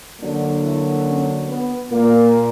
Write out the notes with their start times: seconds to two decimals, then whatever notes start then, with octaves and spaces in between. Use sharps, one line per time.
0.21 D3 F#3 A#3 D4
0.63 E4
1.05 C#4
1.48 B3
1.91 A#2 A#3